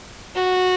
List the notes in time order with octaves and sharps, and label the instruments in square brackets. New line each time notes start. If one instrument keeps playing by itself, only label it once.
[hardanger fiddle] F#4